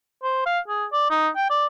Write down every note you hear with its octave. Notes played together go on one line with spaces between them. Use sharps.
C5
F5
G#4
D5
D#4
G5
D5